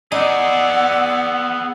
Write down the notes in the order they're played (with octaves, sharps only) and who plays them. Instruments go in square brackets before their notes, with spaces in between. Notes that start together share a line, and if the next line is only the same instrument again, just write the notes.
[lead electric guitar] B3 G#4 [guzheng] D#4 [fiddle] D5 [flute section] F#5 E6